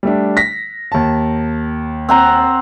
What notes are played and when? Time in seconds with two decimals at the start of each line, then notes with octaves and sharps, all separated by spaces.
0.03 G3 A3 D4
0.37 A#6 B6
0.92 D#2 A5
2.09 C4 F#5 A#5